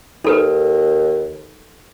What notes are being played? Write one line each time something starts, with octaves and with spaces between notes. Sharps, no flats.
D#2 D#4 A4 B4